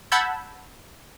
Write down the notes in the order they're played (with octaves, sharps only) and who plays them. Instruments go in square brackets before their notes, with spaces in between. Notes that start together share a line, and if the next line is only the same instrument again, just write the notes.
[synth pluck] F#5 A5 B5 E6 G6 G#6